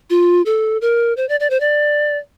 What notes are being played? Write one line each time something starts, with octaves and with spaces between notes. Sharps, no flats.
F4
A4
A#4
C5
D5
D5
C5
D5